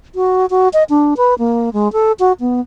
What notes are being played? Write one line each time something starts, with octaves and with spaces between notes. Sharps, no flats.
F#4
F#4
D#5
D4
B4
A#3
G#3
A4
F#4
B3